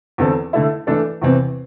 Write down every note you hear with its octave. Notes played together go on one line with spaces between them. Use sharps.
E2 D3 C4 A4
D3 A3 E4
E3 A3 D4 A4
E2 C3 E3 C4